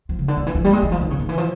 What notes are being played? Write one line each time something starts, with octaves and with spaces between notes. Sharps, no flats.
F3
C#3
D3
D#3
E3
F3
G3
G#3
E3
F3
D#3
C#3
D#3
E3
F3